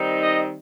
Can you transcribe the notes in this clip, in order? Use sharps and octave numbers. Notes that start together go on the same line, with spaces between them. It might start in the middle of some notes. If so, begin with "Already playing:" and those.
Already playing: D#3 G3 C4 D#4
D#5